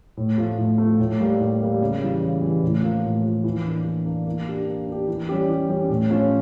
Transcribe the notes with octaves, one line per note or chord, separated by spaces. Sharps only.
A2
F3 A3
A2
F3 A3
A2
G3 A#3
A2
G3 A#3
C#3
E3 G3
C#3
E3 G3
A2
F3 A#3
A2
F3 A#3
E3
A#3 D4
E3
A#3 D4
A#3
D4 G4
A#3
D4
G4
E3
G3 C#4 G4
E3
G3 C#4 G4
A2
F3 C#4